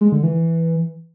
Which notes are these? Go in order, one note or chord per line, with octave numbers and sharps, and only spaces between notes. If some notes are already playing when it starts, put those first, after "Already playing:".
G#3
D3
E3